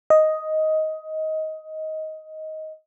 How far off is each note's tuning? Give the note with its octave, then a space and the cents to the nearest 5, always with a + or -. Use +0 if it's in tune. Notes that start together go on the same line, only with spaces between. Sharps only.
D#5 +10